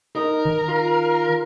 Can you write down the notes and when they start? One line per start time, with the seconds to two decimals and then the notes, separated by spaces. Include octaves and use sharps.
0.15 D#4 A#4
0.45 D#3
0.68 F4